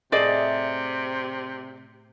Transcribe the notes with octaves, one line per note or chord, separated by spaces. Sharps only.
A2 C3 A3 G#4 D5 D#5